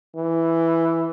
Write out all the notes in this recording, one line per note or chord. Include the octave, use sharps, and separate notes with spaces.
E3